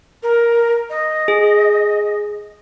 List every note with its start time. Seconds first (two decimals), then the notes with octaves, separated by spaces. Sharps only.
0.23 A#4
0.90 D#5
1.28 G#4